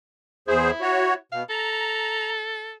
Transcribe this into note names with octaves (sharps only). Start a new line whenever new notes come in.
E2 E4 G#4 C5
F#4 C#5
B2 F5
A4 A#5